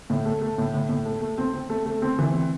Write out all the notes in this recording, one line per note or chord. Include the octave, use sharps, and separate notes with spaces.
A2
A3
A3
A2
A2
A2
A3
A3
C4
C4
A3
A3
C4
E3
C4